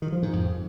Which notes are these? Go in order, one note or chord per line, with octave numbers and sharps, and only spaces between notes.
D#3
F3
G#2
F2